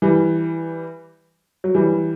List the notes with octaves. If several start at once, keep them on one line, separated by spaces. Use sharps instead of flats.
E3 G3
F#3
E3 G3